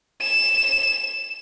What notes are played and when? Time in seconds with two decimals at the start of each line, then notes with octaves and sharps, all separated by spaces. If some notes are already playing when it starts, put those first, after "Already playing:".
0.22 E7